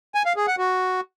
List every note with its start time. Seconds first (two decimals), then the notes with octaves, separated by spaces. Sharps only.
0.15 G#5
0.26 F5
0.36 G#4
0.47 F#5
0.58 F#4